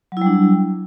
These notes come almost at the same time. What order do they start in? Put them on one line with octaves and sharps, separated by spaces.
F#3 E4 G3 D4